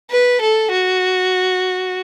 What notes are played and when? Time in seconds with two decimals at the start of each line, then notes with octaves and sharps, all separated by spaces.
0.11 B4
0.41 A4
0.72 F#4